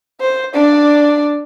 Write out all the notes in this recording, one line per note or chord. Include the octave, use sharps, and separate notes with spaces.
C5
D4 D5